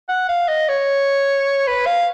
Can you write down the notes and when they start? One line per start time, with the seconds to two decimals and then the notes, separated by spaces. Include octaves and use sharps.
0.09 F#5
0.29 F5
0.48 D#5
0.69 C#5
1.67 B4
1.86 F5